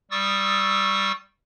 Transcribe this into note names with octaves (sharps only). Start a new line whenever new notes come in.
G3 C#6 D#6 E6 A6